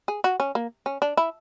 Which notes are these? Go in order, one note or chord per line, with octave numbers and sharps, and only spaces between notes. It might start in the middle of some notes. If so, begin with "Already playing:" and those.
G#4
F#4
C#4
A#3
C#4
D4
E4